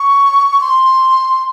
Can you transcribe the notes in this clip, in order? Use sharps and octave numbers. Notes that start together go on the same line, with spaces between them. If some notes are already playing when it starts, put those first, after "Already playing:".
Already playing: C#6
C6